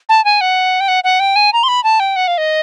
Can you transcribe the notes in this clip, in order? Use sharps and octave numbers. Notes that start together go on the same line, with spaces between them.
A5
G#5
F#5
G5
F#5
F#5
G5
G#5
A#5
C6
B5
A5
G5
F#5
F5
D#5